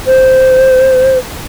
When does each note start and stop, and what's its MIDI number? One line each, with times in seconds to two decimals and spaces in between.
0.07 1.18 72